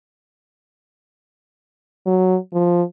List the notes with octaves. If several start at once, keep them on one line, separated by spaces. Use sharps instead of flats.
F#3
F3